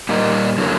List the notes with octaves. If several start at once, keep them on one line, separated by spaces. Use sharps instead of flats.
A#2 G3 A#3 D#4
D3 F#3 A#3